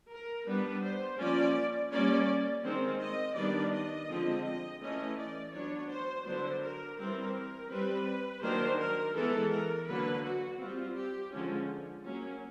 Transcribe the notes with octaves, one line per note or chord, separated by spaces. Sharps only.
A#4
G3 B3 D4 B4
C5
F3 A#3 C#4 D5
G3 A#3 C#4 D5
D#3 G#3 C4
D#5
D#3 G3 B3 D4 D5
D#5
D3 F3 G#3 C4
D#5
E3 A3 C#4 D#5
D5
F#3 B3 D4 C#5
C5
D3 F#3 B3 D4 C5
A#4
E3 G3 C4 A#4
G3 C4 B4
D#3 F#3 A#3 D4 C5
A#4
E3 G#3 B3 A4
A#4
D3 F#3 A#3 B4
F#4
G3 C4 F4
G4
D3 F3 G#3 C#4
F#3 A#3 C#4